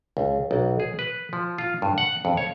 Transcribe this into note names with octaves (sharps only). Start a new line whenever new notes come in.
C#2
B1
G#4
B4
F3
F4
G2
F#5
F2
C#5